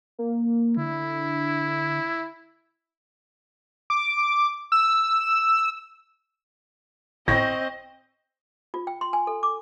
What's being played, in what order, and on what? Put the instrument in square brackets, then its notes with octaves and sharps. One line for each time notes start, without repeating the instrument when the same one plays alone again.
[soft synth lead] A#3
[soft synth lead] D3 [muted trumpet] E4
[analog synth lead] D6
E6
[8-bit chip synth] G1 A2 [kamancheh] C4 D#5 [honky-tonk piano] C#6 G6 A#6
[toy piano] F4
G5
C6
G#5
A4
D6